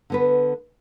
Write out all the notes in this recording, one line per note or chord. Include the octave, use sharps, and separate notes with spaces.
D3 B3 B4